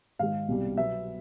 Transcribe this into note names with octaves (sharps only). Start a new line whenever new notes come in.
G#2 D#3 G#3 F5
C2 B2 G3
B2 F#3 B3 E5